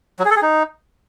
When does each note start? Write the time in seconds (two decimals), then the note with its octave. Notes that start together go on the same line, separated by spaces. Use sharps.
0.19 F#3
0.25 G#4
0.31 A4
0.36 G#4
0.42 D#4